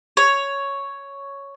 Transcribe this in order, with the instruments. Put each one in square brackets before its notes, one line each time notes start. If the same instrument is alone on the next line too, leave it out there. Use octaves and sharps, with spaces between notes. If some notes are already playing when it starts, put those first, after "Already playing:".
[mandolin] C#5